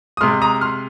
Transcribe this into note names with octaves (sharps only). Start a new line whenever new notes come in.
D#6
C3 G#3 C6 F6
A#5 D#6
C6 F6